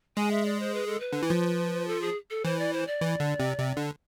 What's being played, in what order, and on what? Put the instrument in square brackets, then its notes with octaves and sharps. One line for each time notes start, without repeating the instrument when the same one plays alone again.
[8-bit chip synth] G#3 [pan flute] G#5
[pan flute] E5
D5
C5
B4
A4
B4
[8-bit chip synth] D3
E3
F3
[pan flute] A4
G#4
A4
[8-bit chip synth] E3 [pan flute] C5
[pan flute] D5
C5
D5
[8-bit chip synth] E3
D3
C3
C3
D3